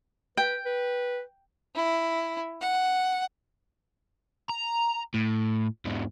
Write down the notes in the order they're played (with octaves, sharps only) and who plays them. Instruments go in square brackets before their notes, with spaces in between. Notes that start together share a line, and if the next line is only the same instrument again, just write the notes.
[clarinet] B4 [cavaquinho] G5
[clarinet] B4
[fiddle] E4
F#5
[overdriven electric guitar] A#5
A2
E2 G#2